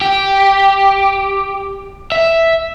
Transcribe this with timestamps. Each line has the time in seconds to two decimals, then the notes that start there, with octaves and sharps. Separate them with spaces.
0.01 G4
2.12 E5